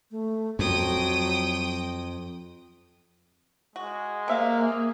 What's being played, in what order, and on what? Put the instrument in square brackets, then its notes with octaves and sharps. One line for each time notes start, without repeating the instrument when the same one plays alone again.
[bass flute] A3
[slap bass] F2 [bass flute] F#3 [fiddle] G5 D#6
[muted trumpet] G#3 [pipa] F#4
[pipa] C3 E5 F5 [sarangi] A#3
[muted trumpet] G#4